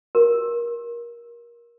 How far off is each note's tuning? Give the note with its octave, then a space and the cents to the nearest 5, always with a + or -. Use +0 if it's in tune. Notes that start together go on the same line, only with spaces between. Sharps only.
G4 -35 A#4 +20